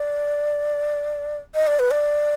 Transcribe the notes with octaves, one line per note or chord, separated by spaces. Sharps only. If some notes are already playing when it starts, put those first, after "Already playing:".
Already playing: D5
D#5
D5
B4
D5